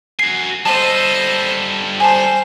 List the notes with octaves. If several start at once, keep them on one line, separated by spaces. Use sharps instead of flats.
F#4 G#5 C7
G3 A4 C5 D#5 A5
C5 G#5 A5